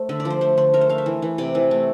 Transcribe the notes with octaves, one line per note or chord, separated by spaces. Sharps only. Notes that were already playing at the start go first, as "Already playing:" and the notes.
Already playing: A3 C5
D3 E5
D5
F3
C5
A3 C5
D3 C5
A3 A#4
C5
A3 F5
E5
E3
E3
C3 D5
E3
A3